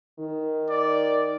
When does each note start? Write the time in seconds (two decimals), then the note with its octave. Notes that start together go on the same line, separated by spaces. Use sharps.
0.19 D#3
0.70 D5